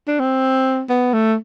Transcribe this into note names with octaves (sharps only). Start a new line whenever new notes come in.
D4
C4
B3
A3